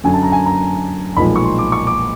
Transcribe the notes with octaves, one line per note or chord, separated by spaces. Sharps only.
F#2 D3 F#3 G#5
A5
A#5
G#5
A#5
B1 A#2 F3 G#3 B5
C#6
C6
D6
C#6
D6